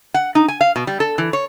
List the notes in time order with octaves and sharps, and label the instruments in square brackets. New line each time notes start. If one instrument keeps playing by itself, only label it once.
[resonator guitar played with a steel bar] F#5
D#4
G#5
F5
B2
G3
A4
E3
C#5